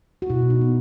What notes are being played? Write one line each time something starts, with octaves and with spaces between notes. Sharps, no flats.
F#4
B2 E4
D#4
B3